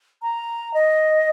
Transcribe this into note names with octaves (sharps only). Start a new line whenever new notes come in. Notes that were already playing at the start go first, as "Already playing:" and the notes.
A#5
D#5